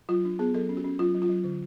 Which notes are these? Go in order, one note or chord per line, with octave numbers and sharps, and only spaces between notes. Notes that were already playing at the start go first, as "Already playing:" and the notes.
F#3 F4
D4
B3 G#4
F#3 A4
C#4
F#4
C#4
F#3 F4
F#3
F4
F#3
D3